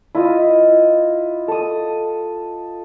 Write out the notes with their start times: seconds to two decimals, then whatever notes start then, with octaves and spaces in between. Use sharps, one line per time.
0.15 E4 F4 D#5
1.48 A4 D#6